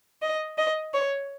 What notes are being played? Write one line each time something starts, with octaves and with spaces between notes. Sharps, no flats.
D#5
D#5
C#5